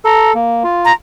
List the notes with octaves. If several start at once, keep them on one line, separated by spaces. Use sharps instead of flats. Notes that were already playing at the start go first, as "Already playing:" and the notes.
A4 A#5
A#3
F4
A#5